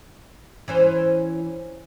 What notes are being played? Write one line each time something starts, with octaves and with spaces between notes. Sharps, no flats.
E3 C#4 C5